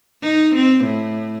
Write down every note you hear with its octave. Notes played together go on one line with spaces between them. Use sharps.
D#4
C4
A2